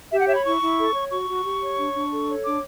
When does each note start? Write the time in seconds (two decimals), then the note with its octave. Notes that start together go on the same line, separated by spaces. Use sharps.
0.11 G4 E5
0.20 F#5
0.28 C#5 E5
0.37 B5
0.45 E4 C#6
0.62 E4
0.78 A4
0.95 C#5
1.11 F#4 C#6
1.28 F#4
1.44 G4
1.62 C#5
1.78 D4
1.95 D4
2.12 A4
2.28 C#5
2.45 D4 D6